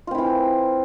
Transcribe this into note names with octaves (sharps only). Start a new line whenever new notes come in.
E3 C4 E4 F4